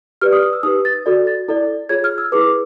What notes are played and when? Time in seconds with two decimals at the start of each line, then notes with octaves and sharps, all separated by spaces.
0.21 G4 B4 D5 F6
0.33 D#6
0.43 D#6
0.53 E6
0.63 D#4 G4 B4 D#6
0.85 A6
1.06 F#4 A4 D5
1.27 A6
1.48 E4 A4 D5
1.89 F4 G#4 C#5 G#6
2.04 F6
2.18 E6
2.32 E4 G#4 B4 D6